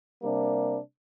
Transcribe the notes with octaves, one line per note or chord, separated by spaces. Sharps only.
C3 G3 A#3 D4